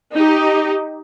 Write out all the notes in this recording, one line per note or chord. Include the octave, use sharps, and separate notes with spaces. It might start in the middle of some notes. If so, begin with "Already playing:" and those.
D#4 G4